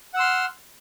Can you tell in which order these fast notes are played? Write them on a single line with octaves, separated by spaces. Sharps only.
F#5 E6 C6 F6